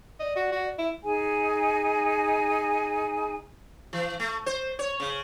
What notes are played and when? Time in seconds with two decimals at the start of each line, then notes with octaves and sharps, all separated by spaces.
0.20 D5 D#5
0.36 F#4
0.52 F#4
0.78 E4
1.03 D#4 G#4 G#5
3.93 E3
4.20 A3
4.46 C5
4.79 C#5
5.00 C#3